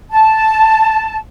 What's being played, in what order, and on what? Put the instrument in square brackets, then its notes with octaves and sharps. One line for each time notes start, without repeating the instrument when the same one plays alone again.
[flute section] A5